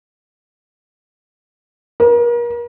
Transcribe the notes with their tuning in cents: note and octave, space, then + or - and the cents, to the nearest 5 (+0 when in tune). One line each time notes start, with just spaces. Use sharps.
A#4 +40